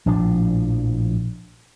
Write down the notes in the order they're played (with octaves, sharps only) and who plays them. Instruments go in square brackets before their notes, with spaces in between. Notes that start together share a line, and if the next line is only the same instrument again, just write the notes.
[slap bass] A#1 A2 F3 D4